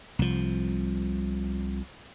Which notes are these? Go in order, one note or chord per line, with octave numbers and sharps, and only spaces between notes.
C2 F3